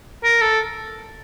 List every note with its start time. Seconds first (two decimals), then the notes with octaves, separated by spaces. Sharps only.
0.24 A#4
0.41 A4